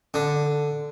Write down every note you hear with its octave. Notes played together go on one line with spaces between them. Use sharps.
D3